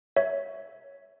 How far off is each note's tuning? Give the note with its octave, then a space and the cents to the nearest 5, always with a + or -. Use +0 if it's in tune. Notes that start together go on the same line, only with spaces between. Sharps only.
C#5 +10 E5 -10